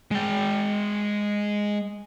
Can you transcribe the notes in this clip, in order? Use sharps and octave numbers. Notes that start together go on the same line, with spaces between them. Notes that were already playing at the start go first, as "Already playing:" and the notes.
G#3 G5